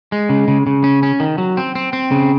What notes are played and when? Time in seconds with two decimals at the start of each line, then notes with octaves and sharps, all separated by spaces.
0.12 G#3
0.29 C#3
0.48 C#3
0.67 C#3
0.84 C#4
1.03 C#4
1.20 D#3
1.38 F#3
1.57 C4
1.75 C4
1.93 C4
2.11 C#3